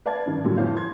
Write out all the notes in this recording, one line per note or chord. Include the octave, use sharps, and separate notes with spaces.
B4 D5 F5 A5 G#6
G2 D#3
A#2 D3 E3 F#3 G3
F2 E3 C#5 F5 G6
C6 G#6